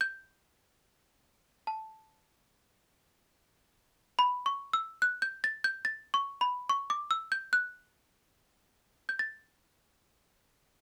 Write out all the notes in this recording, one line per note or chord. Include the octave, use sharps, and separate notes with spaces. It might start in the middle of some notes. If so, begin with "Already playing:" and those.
G6
A5
B5
C#6
E6
F#6
G6
A6
G6
A6
C#6
B5
C#6
D6
E6
G6
F#6
G6
A6